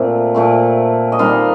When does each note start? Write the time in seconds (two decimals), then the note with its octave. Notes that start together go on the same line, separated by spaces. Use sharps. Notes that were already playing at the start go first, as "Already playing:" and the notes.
Already playing: A#2 A3 C4
0.35 A#2 A3 C4
1.12 D#5
1.19 D#3 G3 C4 F5